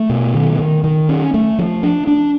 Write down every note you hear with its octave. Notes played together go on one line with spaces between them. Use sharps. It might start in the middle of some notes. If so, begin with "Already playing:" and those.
Already playing: A3
B2
D#3
D#3
D#3
C#4
A3
F3
D4
D4